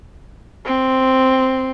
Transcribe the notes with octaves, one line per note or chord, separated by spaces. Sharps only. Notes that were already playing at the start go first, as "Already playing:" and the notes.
C4